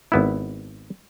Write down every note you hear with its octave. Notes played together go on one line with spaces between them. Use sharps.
G#1 B3 E4